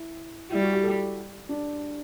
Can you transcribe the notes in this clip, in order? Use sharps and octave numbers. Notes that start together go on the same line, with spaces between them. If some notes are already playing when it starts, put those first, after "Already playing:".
Already playing: E4
G3 E4
F#4
G4
A4
D4